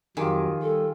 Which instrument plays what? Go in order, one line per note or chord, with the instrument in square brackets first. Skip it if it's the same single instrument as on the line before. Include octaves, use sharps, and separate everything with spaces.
[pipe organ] F2 F#3 [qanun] D#3 [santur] F4 G4 G#4
[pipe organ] G3 [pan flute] A4